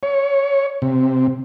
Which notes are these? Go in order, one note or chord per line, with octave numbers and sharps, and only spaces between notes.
C#5
C3